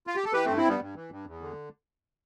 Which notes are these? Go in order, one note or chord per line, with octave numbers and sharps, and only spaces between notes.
F4
G4
A4
E3 G4 B4
G2 A3 C4
C4 E4
G2 G3 B3
G2
E3
G2
E2
D3